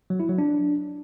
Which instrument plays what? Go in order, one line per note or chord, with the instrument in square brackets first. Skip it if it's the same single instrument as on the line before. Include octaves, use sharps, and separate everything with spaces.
[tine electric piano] F#3
E4
F#3
D4